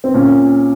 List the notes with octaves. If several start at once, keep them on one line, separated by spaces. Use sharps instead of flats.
C4
A#2 C#4